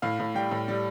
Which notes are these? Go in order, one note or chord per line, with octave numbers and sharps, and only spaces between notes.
A2 F5
A2
G3 G5
A2
G3